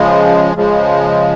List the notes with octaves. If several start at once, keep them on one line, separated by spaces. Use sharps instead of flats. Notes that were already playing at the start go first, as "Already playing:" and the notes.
Already playing: C#3 F3 G#3
C#3 F3 G#3